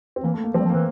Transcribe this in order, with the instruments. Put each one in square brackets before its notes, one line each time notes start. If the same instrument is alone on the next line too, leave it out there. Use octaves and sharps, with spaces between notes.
[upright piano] C4
[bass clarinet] E3 [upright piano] A#3
[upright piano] A3
A#3
[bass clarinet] F3 [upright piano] C4
[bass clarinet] G3
F3
[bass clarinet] E3 [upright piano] A#3